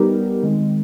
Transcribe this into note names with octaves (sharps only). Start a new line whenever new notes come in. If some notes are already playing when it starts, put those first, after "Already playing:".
Already playing: G3 B3 D#4 G4 A#4
D#3 G#3 C4